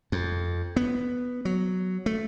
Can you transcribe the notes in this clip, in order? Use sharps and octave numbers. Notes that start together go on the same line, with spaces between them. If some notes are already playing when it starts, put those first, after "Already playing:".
F2
B3
F#3
A3